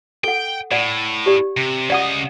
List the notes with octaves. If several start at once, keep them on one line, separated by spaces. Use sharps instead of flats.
A4 F#5 G5
A2 D5 F#5
G4 D5
C3
C#3 D5 D#5 F#5 D#6